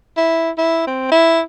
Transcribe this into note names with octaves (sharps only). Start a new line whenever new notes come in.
E4
E4
C4
E4